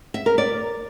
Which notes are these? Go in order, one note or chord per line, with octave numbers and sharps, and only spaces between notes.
E5
A#4
D5